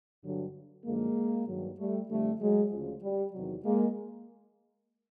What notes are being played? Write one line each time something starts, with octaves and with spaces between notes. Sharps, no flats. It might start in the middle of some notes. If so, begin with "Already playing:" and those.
G2 D3 F#3
F#2 D3 F3 G#3 A#3
G2 D#3 F#3
G3 A3
F2 D3 F3 G3 A3
F#3 G#3
D2 C#3 F3
G3
E2 C3 D#3 F#3
G#3 A#3